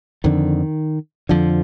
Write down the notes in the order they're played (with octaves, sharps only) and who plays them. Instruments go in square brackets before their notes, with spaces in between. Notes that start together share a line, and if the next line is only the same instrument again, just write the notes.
[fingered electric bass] F2 D3 D#3
F2 D3 F3